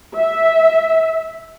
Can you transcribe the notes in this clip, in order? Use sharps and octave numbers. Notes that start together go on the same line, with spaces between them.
E5